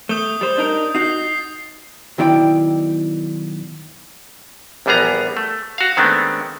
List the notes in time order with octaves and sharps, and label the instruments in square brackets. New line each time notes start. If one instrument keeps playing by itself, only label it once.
[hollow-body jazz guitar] A3 [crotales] D#6 G6 G7
[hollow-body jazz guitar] G3 C5 [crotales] A6
[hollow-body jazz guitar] D4 D#4 A#4
[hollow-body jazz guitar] D#4 F#4 [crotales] C7
[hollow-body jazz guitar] B1 D#3 E4 D5 G5
[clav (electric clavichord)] A#1 E2 G3 B3 G#4 A#5
A3
F#4 F5
D#3 G#3 A3 B3 C4 D4